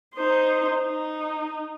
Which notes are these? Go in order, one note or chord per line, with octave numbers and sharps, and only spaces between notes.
D#4 C5
D#4